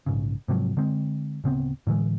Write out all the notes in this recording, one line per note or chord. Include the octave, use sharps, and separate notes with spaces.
A#1 G#2 C#3
G#2 C3 F3 F#3
D3 G#3 C4
D1 C#3 B3 C4
A2 D3 E3 G#3